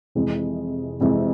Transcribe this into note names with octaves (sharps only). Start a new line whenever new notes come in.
F2 C3 E3 G#3
F2 C3 E3 G#3